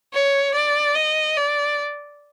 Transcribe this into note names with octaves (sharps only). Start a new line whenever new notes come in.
C#5
D5
D#5
D5